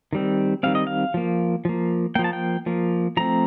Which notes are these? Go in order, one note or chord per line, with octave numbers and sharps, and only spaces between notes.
D#3 G3 C4
D#3 G3 C4 F5
D#5
F5
F3 A#3
F3 A#3
F3 A#3 G5
A5
G5
F3 A#3
F3 A3 C4 A#5